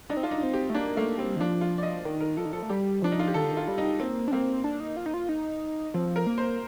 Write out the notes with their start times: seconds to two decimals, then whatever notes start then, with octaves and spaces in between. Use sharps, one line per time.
0.10 D4 D#4
0.17 C4
0.23 D4 F4
0.31 D#4
0.43 C4
0.53 G4
0.69 A3
0.74 A#3 D4
0.97 A3 A#3
1.18 G3 C4
1.36 D#3
1.40 F3 D4
1.61 F4
1.78 D5
1.83 D#5
2.05 D#3 D5
2.20 A#4
2.37 F3 A4
2.45 D#3
2.52 F3 A4
2.62 A3
2.69 G3 G4
3.02 F3 D4
3.12 D#4
3.19 F4
3.27 G4
3.34 D#3 A4
3.43 D3
3.51 D#3
3.57 F4
3.68 G3
3.78 D#4
4.00 A#3 C4
4.28 D4
4.31 A#3 C4
4.64 D4
4.80 D#4
4.97 F4
5.06 D#4
5.14 F4
5.29 D#4
5.94 F3 C4
6.16 A#4
6.27 A#3
6.38 C5